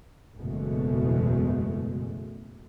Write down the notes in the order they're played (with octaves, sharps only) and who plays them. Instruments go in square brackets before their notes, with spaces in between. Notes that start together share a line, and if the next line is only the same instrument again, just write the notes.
[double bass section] F#1 E2 B2 G#3 A3